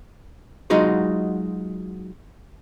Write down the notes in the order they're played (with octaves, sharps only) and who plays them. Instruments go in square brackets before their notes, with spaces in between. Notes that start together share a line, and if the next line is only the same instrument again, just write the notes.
[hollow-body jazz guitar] F#3 G#3 D#4 F4 F#4 G#4